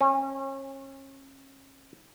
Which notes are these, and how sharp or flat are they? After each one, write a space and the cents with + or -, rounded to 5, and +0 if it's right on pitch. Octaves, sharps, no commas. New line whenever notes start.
C#4 -35